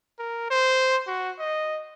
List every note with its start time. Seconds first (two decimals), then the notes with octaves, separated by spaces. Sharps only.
0.19 A#4
0.50 C5
1.07 F#4
1.39 D#5